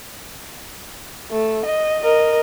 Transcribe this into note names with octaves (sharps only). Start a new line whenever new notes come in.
A3
D#5
A#4 D#5